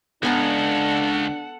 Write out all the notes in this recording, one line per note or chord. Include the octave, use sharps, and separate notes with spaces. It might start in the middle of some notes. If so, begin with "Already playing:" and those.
C#2 B3 D4 A4 F#5 G#5 A#5